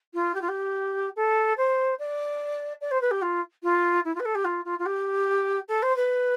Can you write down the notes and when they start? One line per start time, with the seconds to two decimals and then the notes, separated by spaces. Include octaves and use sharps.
0.13 F4
0.34 G4
0.41 F4
0.48 G4
1.16 A4
1.57 C5
1.99 D5
2.81 D5
2.91 C5
3.01 B4
3.11 G4
3.21 F4
3.63 F4
4.04 E4
4.14 F4
4.19 B4
4.25 A4
4.34 G4
4.44 F4
4.65 F4
4.78 F4
4.85 G4
5.68 A4
5.82 C5
5.96 B4